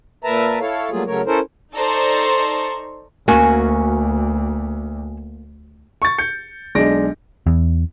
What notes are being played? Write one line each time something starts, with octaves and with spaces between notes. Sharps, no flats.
A#2 A#4 B4 E5 A5 A#5
E4 A4 C#5 F5
F#3 G3 A3 A#3 F4 G#4
C#3 F#3 A3 A#4 C#5
C#4 E4 A4 A#4 C5
D#4 A4 C5 D5 A#5 C#6
D2 A#3 C#4 F#4 G#5
C#6 A6
G6 C#7
B1 G#3 D4 A#6 D7
E2